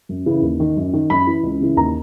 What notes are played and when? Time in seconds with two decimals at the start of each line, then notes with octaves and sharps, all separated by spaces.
0.09 F#2
0.26 C#3 E3
0.42 D#2
0.60 D#3
0.77 F#2
0.93 D#3
1.10 F#2 B5
1.27 E3
1.43 C#2
1.61 C#3 E3
1.77 D#2 A#5